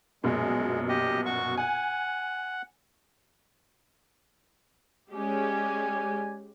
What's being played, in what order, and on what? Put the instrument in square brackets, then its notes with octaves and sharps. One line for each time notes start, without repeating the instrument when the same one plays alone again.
[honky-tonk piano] A#1 F#2 B2 [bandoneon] G#3
[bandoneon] G4 D#5
F#4 C#6
[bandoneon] F#5 [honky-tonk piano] G#5
[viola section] G#3 C#4 G4 [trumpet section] D5 G#5